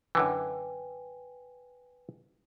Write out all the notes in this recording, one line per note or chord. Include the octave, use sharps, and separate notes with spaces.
F#2 D3 E3 B4 G5 G#5